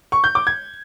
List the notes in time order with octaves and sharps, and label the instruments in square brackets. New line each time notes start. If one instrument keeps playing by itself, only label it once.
[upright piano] C#6
G6
D6
G#6